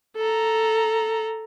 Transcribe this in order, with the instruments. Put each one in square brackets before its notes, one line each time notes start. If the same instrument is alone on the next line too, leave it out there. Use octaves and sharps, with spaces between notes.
[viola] A4 A#5